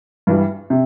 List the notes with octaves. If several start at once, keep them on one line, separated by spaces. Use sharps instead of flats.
G2 E3 G3
C3